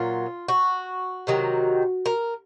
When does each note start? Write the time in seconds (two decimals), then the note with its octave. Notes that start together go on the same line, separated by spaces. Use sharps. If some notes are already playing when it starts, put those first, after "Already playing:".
Already playing: A#2 F#3 F4
0.48 F#4
1.27 C3 D#3 F#3
2.06 A#4